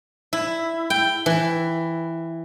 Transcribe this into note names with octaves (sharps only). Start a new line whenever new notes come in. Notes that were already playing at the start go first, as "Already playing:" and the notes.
E4
G5
E3